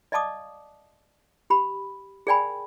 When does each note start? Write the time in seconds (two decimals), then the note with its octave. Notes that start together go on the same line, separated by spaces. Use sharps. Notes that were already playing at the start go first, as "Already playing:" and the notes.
0.12 D5 D#5 F5 A5 D6 D#6
1.50 G4 B5
2.27 G#4 A#4 D5 G5 G#5 B5